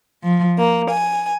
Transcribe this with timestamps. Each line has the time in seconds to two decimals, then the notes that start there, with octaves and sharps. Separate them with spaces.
0.24 F3
0.58 A#3
0.90 G#5